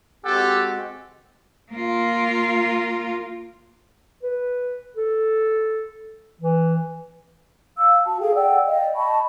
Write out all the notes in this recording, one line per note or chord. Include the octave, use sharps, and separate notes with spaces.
G#3 C4 F#4 G4 A4 F#5
A#3 F4
B4
A4
E3
F5 E6
F#4 A5
G#4 A4 F5 G5
D5 F#5 G5 E6
D5 D#5 F5 G5
D#5 A5 B5 C#6